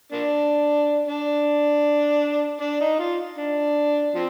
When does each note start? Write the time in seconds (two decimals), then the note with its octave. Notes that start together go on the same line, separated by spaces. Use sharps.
0.12 A#3 D4
1.08 D4
2.61 D4
2.81 D#4
2.99 F4
3.38 D4
4.14 F3 C4